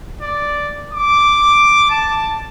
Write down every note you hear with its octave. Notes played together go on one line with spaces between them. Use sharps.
D5
D6
A5